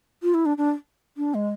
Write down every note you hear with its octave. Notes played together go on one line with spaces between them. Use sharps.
F4
E4
D4
D4
D4
G#3